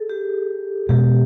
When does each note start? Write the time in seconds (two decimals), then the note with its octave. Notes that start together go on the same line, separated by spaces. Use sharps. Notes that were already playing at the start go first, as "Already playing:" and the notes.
Already playing: G#4 A4
0.09 G4
0.89 B2 G#3 C#4 G4